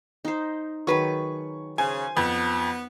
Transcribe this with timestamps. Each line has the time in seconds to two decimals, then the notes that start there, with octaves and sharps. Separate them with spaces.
0.25 D#4 C5
0.87 D#3 F#3 G#4 B4 C#6
1.78 C#3 C5 G#5
2.17 F2 B3